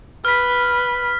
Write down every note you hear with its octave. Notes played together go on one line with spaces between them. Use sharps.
B4 F6 B6